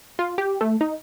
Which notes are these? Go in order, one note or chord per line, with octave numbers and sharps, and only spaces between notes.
F4
G4
A3
D#4